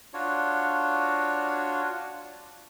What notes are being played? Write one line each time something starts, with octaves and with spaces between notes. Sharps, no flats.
D4 F4 F#4 C#5